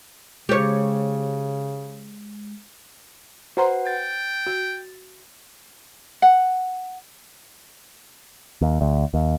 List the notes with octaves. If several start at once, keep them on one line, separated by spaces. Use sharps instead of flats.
C#3 G#3 G4 C#5
F#4 B4 C5 F#5 A#5 C6
G5 A6
F#4
F#5
D#2
D2
D#2